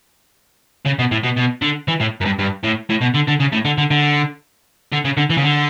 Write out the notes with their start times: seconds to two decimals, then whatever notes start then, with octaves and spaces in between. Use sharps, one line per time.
0.86 C#3
0.99 B2
1.11 A2
1.23 B2
1.37 B2
1.62 D3
1.88 E3
2.00 A2
2.21 F#2
2.25 G2
2.39 G2
2.63 A2
2.89 A2
3.01 B2
3.14 D3
3.28 D3
3.40 C#3
3.52 A2
3.65 D3
3.78 D3
3.91 D3
4.92 D3
5.05 C#3
5.17 D3
5.30 E3
5.37 C#3
5.43 D3